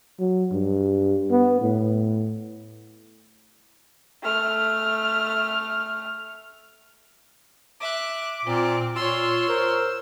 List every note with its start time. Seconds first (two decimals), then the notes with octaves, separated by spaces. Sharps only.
0.20 F#3
0.52 G2
1.31 B3
1.62 A2
4.23 A3 F6
7.80 E5 D6 F#6
8.45 A#2 C4
8.96 A#2 F4 C#5 C6 E6
9.48 A#4 C5